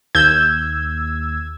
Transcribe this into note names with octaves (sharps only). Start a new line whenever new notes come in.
D#2 E6 G6 G#6